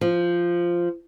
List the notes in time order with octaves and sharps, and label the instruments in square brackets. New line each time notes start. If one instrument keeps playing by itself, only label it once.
[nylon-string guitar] F3